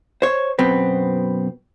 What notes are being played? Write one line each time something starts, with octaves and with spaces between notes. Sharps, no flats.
C5 C#5
F#2 B2 B3 C4